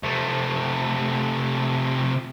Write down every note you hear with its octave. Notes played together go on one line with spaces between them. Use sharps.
C3 A3